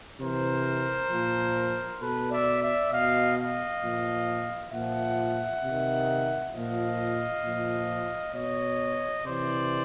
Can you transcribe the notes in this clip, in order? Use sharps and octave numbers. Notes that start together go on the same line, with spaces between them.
C3 E3 A#4 C5
A#2 F3
B2 A4 B4
D5 E5
D5 E5
B2 D#5 F5
D#5 F5
A#2 F3
A#2 F3 E5 F#5
C3 D#3
A#2 F3 D#5 F5
A#2 F3
B2 C#5 D#5
C3 E3 C5 D5